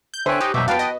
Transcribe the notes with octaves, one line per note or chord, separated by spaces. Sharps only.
G6
D3 C5 C#5 E5 G5 G#5 F#6
D#4 G4
F#2 B2 E5 C#6 D6 G6
B3 F#4 B4 F5 G5 A5
D#5